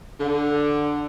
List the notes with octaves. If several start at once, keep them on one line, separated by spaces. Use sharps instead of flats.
D3